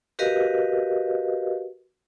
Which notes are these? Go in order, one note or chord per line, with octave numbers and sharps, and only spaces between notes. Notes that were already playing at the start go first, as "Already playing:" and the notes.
F#4 G4 A#4 B4 D#5 F5